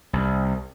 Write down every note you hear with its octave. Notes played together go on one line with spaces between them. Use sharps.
C2